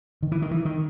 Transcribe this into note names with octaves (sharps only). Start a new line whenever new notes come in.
D#3
E3
D#3
E3
D#3